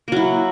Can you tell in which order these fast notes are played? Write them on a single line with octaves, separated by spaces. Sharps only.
A#3 F#3 E4